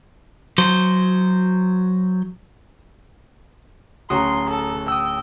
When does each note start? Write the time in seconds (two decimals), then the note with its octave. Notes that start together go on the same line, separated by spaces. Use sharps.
0.58 F#3 C5
4.10 D1 C#4 F#4 A#5 C6 D#6
4.49 A4
4.88 G5 D#6 E6